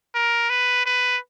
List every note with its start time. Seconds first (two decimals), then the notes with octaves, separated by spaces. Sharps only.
0.15 A#4
0.50 B4
0.86 B4